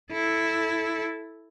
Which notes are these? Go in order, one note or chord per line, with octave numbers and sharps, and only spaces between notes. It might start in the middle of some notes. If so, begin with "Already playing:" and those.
E4 A4